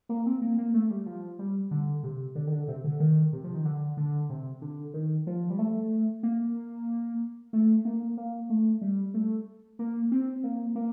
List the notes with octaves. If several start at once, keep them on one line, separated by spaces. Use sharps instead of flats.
A#3
C4
A#3
A#3
A3
G3
F3
G3
D3
C3
D3
D#3
D3
C3
D3
D#3
C3
F3
D#3
D3
D3
C3
D3
D#3
F3
G3
A3
A#3
A3
A#3
A#3
A3
G3
A3
A#3
C4
A#3
A#3